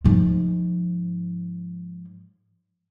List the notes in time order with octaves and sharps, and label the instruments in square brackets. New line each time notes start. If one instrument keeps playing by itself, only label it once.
[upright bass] G#2 F3